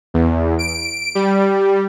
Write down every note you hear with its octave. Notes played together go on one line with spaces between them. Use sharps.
E2
D7
G3